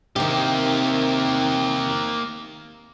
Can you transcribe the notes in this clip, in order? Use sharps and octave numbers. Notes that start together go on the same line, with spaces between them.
C3 D#3 A#3 G4